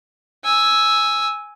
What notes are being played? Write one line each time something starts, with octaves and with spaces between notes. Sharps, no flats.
G#5 E6